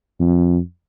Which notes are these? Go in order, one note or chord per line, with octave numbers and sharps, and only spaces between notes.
F2